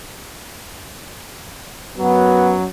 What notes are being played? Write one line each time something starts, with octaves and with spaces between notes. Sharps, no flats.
F#2 F#3 B3